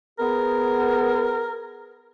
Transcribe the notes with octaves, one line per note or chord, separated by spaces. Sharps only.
B3 G#4 A#4